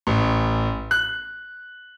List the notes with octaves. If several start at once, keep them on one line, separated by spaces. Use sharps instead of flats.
A1
F#6